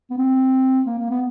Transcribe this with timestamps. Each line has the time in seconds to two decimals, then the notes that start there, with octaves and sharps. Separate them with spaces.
0.10 B3
0.18 C4
0.86 A#3
0.99 A#3
1.10 B3